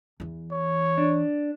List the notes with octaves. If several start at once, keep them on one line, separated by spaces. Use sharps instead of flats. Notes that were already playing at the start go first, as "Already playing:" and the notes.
E2 E3
C#5
D4